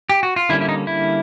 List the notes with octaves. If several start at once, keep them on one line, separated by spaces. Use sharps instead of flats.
G4
F#4
F4
D3 G3 A#3 C#4 E4
E4
D#4
E4